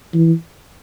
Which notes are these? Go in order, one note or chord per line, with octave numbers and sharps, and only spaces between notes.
E3